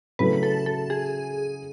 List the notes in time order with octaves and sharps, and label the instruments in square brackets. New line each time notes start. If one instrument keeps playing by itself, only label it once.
[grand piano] C#3 F#3 A3 E4 [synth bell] B4
[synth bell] A4
A4
G#4